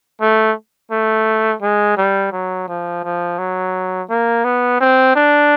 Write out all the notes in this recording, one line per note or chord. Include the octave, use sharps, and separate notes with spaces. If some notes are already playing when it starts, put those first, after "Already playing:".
A3
A3
G#3
G3
F#3
F3
F3
F#3
A#3
B3
C4
D4